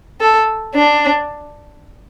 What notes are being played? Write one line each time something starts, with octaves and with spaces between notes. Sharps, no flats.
A4
D4